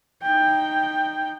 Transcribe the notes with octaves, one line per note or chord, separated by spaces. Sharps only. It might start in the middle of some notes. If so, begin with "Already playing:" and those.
D#4 G5